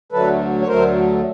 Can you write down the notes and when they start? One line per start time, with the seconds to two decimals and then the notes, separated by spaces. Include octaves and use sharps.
0.12 D2 D3 F#3 A3 A4 B4
0.61 C#5
0.67 D2 D3 F#3 A3 A#4 C5